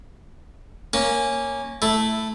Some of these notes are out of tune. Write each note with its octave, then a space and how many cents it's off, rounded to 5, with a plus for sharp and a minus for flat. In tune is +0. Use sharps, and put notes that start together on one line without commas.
A#3 +0 C#4 -5
A3 +0 E4 +0